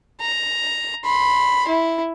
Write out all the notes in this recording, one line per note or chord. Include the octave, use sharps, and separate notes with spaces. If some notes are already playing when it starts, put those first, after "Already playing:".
A#5
B5 C6
E4